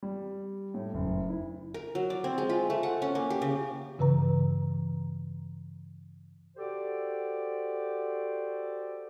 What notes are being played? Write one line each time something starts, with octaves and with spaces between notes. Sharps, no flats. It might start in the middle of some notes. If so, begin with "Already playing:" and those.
G3
A2
F#1
E4
A#4
F#3
D5
C4
G#3
F4
A3
F#5
C#4
A#3
G4
C#3
G2 C#3 E3 B4 A#5
F#4 G4 A4 C5 D5